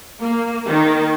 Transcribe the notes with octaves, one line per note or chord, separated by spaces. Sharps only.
A#3
D#3